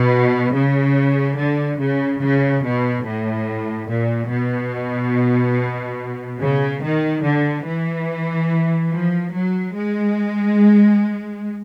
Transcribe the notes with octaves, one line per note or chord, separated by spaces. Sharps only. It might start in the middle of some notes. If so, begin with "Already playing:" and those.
Already playing: B2
C#3
D3
C#3
C#3
B2
A2
A#2
B2
C#3
D#3
D3
E3
F3
F#3
G#3